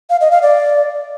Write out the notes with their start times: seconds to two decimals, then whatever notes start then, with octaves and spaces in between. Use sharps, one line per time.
0.10 F5
0.21 D#5
0.32 F5
0.42 D5